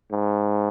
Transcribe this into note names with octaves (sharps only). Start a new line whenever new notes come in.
G#2